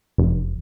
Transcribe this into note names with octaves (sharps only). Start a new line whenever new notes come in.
F1